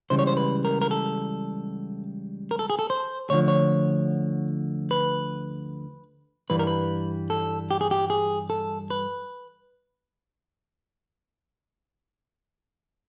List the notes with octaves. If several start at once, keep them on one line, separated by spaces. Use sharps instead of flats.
C#2 C#3 E3 G3 C5
C#5
C5
B4
A#4
A#4
A4
A#4
A4
G#4
A4
C5
D2 D3 F3 C#5
C#5
B4
G2 E3 G3 B4
A#4
B4
A4
G4
G#4
G4
G#4
A4
B4